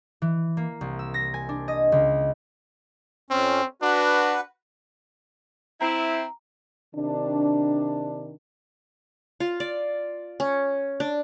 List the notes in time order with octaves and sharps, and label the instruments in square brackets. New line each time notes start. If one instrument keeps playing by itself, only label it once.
[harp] E3
A#3
C2
E6
A#6
G#5
D4
D#5
C#2
[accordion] F2 C#4 [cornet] C4
[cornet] D4 [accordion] F#4 B4
[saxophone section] C4 E4 [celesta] A#5
[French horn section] C3 D#3 D4
[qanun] F4
D5
C#4
D4